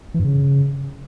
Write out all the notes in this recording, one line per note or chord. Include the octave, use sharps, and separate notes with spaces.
E3
G2
C#3